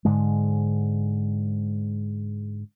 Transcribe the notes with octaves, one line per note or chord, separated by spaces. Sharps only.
G#2 D3 G#3